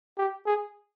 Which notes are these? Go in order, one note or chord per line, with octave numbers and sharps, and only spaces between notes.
G4
G#4